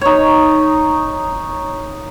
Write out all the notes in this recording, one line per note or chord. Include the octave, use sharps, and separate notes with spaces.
D#4 C#5